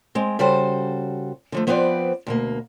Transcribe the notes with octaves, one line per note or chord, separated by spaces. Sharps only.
G#3 C4
C#3 G3 F#4 A4 C5
D3 F3 A3
F3 B3 C4 B4 C5 D5
D2 B2 A#3